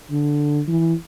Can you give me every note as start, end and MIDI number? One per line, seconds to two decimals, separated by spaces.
0.11 0.60 50
0.68 0.93 52